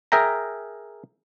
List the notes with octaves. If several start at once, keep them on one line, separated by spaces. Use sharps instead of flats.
G#4 A#4 E5 G5 A#5